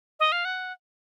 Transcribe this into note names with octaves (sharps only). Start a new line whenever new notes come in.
D#5
F5
F#5